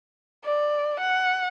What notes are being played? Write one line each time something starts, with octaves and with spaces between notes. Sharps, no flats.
D5
F#5